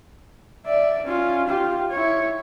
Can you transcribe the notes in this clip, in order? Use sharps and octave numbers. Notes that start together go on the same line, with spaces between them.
D5 E5
C#4 F4
F4 G4
E4 C#5